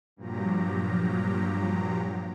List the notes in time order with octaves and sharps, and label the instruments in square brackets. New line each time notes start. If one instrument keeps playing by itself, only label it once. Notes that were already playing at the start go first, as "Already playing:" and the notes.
[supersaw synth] G2 A#2 F3 F#3 G4 A#5